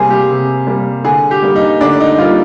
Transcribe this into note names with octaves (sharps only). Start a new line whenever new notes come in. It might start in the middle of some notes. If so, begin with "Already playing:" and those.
Already playing: C3 G3 A#3 G#4 C5
G4
C3
G3 A#3
D3 G#4
G4
G3 A#3
D#4
D3 D4
D#4
G3 A#3 F4